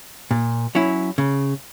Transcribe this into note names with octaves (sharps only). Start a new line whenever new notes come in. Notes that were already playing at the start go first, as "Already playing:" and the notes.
A#2
F#3 C#4 E4
C#3